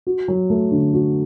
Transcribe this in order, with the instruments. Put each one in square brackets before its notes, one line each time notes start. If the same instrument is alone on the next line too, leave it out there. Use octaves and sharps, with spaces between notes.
[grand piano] F#4
F#3
A3
D3
F#4